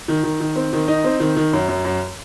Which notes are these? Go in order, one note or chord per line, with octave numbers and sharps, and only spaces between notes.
D#3
D#3
D#3
C4
D#3
D#4
C4
D#3
D#3
F#2
F#2
F#2